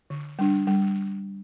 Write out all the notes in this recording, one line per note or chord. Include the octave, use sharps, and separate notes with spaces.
D3
G3 D4
G3